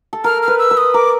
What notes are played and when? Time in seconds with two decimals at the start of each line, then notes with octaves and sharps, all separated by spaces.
0.13 A4
0.24 A#4 F6
0.42 F6
0.48 B4
0.59 E6
0.71 B4
0.77 D#6
0.94 A#4 D6